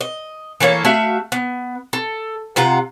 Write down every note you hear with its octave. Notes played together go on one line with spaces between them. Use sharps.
D#5
E3 A3 A#3 C#5
A3 F#4 E5 F5
B3
A4
C3 F4 F#5 A#5